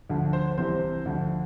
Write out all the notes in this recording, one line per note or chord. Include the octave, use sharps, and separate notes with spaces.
D2 D3 F3
C5
C2 C3 E3 C5
D2 D3 F3